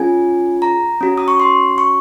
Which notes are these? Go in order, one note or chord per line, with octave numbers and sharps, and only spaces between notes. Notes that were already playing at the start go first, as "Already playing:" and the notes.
Already playing: C#4 F4 G#4 G#5
A#5
C#4 F#4
D#6
C#6
C6
C#6